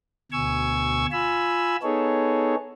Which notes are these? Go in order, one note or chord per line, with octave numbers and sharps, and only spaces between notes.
D2 B2 G#5 C#6 E6 G#6
F4 G#5 B5 E6
B3 D#4 G#4 A4 C#5